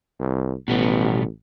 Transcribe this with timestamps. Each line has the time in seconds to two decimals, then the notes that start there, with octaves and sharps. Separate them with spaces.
0.20 C2
0.68 A1 B2 G3 B3